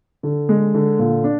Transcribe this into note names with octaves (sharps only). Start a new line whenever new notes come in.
D3
G#3
D3
A#2
D4